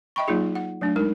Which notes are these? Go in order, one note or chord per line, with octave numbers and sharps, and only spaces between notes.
D#5 E5 G5 B5 C#6
F#3 A#3 D#4 F4 G#4
F#5
F#3 A3 D4
G#3 D#4 A#4